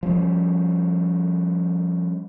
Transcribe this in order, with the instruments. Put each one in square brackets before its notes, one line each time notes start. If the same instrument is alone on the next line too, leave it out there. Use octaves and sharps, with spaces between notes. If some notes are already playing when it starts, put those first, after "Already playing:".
[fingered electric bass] F3 G3 C#4